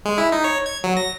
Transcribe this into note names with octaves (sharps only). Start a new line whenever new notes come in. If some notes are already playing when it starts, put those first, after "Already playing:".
G#3
E4
D#4
C#5
G#6
F#3
A#6